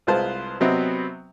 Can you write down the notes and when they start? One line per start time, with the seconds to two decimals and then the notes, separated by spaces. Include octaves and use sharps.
0.07 C2 G#3 F4 B4 C5 A5
0.60 C3 F#3 B3 C4 D#5 E5